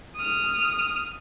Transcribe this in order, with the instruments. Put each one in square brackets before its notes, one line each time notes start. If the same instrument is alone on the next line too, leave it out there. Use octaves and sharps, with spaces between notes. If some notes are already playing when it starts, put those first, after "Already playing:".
[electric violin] D#6 F6